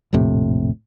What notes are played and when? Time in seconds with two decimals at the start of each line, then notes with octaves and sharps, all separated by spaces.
0.13 A#1 F2 A2 C3